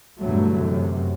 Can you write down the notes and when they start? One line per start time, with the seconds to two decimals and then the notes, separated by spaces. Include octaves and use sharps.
0.19 E2 G2 B2 D3 F#3 A3
0.56 F#2 C3